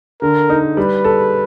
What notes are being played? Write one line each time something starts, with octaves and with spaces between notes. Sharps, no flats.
D3 A#4
D#4
G3 B4
A4